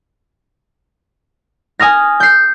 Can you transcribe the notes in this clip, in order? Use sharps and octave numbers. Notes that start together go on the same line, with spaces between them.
G#5 D#6 F6 A#6
G6 C7